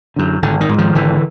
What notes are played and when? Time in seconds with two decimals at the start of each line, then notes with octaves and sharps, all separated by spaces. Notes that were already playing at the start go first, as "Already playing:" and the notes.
0.16 F#2 D3
0.42 G#1 D3
0.61 D#3
0.69 G#2
0.78 D#3 F3
0.95 G#1 D3 E3